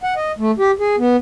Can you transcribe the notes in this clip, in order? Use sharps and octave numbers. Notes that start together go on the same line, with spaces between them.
F#5
D#5
A3
G4
G#4
B3